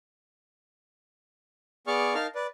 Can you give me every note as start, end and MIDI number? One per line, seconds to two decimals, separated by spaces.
1.87 2.14 59
1.87 2.14 68
1.87 2.14 74
1.87 2.14 85
1.87 2.14 86
1.87 2.14 89
2.15 2.27 63
2.15 2.27 70
2.15 2.27 77
2.15 2.27 81
2.15 2.27 89
2.35 2.47 71
2.35 2.47 74